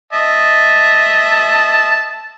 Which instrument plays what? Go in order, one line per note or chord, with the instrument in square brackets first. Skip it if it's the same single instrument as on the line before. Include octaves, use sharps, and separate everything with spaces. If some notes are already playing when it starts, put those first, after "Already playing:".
[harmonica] D#5 E5 A5